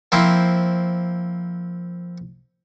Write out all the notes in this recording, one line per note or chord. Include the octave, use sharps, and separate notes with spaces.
F3 A#3 C4 E4